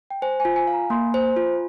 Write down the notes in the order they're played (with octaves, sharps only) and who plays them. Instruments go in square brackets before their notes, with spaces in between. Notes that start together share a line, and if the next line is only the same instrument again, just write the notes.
[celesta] G5
[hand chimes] C5 [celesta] G#5
[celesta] G#5
[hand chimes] F4
[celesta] G#5
[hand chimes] F5
[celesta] A#5
[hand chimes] A#3 [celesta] C6
[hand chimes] C5
F4